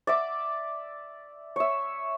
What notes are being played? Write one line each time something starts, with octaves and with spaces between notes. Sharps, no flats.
D5 E5 D6
C#5 E5